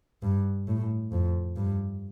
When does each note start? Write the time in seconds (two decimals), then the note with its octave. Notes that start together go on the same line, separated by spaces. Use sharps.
0.22 G2
0.68 A2
1.12 F2
1.56 G2